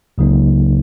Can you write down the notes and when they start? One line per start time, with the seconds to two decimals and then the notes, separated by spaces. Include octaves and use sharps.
0.18 C#2 C#3 F#3 A#3 D#4